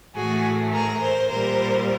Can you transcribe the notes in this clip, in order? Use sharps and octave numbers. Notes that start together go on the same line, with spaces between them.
A2 E3 A3 F#4 G#4
G#4 A#4
A#4 C5
A#2 G3 A#4 C5